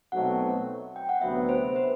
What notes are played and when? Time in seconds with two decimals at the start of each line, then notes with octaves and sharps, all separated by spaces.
0.12 B1 B2 F#3 A3 C4 F#5
0.96 G5
1.09 F#5
1.21 D2 C3 F#3 B3 E5
1.49 C5
1.76 B4